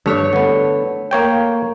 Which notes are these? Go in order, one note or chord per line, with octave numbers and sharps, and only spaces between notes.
G2 A3 C#5
D3 B3
A#3 C#5 G5